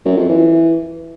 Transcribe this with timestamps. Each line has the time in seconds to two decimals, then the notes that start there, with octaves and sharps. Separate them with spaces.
0.05 F#2
0.17 F2
0.29 E3